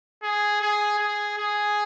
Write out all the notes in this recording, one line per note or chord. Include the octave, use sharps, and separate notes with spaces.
G#4
G#4
G#4
G#4